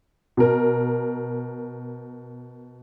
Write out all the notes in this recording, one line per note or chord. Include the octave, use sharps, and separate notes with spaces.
B2 A#4